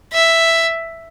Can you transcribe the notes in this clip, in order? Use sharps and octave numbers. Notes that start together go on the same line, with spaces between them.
E5